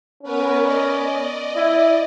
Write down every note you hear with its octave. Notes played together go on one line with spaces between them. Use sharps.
B3 C#4 A#4 B4
D5 D#5
E4